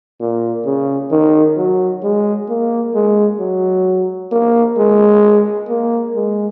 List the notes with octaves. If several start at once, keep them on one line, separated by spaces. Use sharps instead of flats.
A#2
C#3
D#3
F#3
G#3
A#3
G#3
F#3
A#3
G#3
A#3
G#3